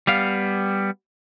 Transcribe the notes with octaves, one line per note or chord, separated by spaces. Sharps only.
G3 B3 F5